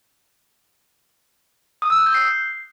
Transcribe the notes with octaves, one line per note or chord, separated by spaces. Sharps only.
D#6
E6
F#6
G6
C7